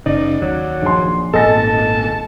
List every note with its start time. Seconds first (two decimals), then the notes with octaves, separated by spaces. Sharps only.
0.06 F#1 C#3 D#4 D5
0.42 D#2 F#3
0.82 A#1 C6
1.34 G#1 A#2 A4 D#5 G#5 A5 A#6